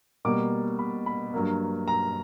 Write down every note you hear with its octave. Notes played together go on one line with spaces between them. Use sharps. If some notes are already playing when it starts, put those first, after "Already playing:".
B2 G3 A#3 D6
B5
B5
G2 F#3 A#3
A#5